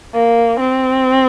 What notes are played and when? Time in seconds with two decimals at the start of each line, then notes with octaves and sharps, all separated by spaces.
0.14 A#3
0.60 C4